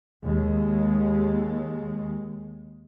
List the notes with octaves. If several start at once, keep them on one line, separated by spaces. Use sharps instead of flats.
D#2 G#3